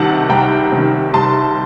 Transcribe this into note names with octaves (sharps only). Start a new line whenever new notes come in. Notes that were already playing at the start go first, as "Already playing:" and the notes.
Already playing: C2 C3 D#3 F#5 A5
C2 G5 A#5
C3 D#3
C2 A5 C6